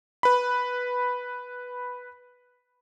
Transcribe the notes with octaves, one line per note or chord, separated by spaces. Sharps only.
B4 B5